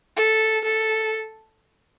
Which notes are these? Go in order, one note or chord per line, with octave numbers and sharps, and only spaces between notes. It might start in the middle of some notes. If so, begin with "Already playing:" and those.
A4
A4